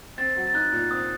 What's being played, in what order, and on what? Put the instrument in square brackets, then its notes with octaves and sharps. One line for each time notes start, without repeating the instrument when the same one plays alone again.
[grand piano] C4 [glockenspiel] A6
[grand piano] F#3
[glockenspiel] A6
[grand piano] D#4 [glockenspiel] F#6
[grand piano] A#2
[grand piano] C4 [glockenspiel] D#6